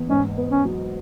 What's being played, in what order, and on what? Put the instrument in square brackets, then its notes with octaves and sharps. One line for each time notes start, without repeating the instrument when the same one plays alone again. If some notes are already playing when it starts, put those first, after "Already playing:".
Already playing: [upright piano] E2
[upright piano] G#2 [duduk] C#4
[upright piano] B3
[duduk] C#4
[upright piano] F#3